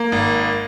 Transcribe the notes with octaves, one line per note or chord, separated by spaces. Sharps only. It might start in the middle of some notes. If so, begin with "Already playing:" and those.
Already playing: A#3
G#1